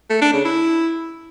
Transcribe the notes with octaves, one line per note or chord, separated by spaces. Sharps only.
A3
D4
C#3
E4